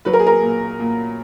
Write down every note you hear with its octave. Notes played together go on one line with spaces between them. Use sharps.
F#3 B4
A#4
G#4
A#4
A#2
A#2